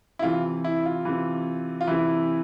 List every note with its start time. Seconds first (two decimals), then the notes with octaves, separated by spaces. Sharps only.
0.19 E4
0.22 C3 E3 F4
0.64 E4
0.85 F4
1.05 C3 E3
1.81 F4
1.87 C3 E3 E4